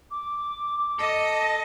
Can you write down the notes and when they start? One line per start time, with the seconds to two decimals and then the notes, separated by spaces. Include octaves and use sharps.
0.11 D6
0.99 A4 D#5